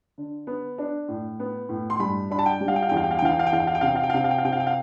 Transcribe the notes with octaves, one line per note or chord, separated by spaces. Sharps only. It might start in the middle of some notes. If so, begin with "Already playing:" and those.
D3
B3
D4
A2
B3
A2
C6
G2 B5
D4 B5
A5
G5
G3
F5
G5
F5
E2 G5
F5
G5
F5
G5
E3 F5
G5
F5
G5
E2 F5
G5
F5
G5
C3 F5
G5
F5
G5
F5
C3 G5
F5
G5
F5
C3 G5
F5
G5
F5